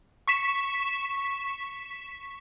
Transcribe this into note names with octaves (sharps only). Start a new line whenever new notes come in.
C#6 B6 E7